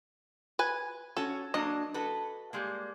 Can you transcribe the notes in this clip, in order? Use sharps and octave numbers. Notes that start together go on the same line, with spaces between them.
B4 G#5
C#4 F#4 A4
F#3 A#3 D4 D#5
F#4 A4 B4
G3 G#3 A#3